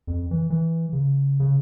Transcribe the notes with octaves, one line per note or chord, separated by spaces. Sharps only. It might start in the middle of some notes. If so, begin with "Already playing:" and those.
F2
E3
E3
C#3
C#3